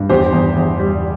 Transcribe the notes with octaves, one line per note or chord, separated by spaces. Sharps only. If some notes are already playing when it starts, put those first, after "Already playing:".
Already playing: G2
E2 G4 C5
E2
E2
G3